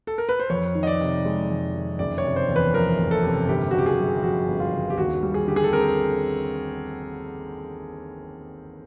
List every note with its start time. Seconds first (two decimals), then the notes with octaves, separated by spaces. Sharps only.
0.07 A4
0.18 A#4
0.29 B4
0.40 C5
0.50 F2 C#5
0.75 D#3
0.83 D#5
0.87 D5
1.00 C3
1.25 G#3
1.49 F2
1.75 D#3
1.99 F#1 D5
2.18 C#5
2.24 C3
2.36 C5
2.48 E2
2.56 B4
2.73 F3 A#4
2.98 F#1
3.11 A4
3.23 C3
3.48 G1 G4
3.71 F#4
3.74 C#3 G4
3.86 G#4
3.98 F#2
4.23 F3 F#4
4.48 G1
4.60 F4
4.73 C#3
4.90 G4
4.98 D#2 F#4
5.23 G3
5.34 G#4
5.47 D3 G4
5.56 G#4
5.64 A4
5.72 C4 A#4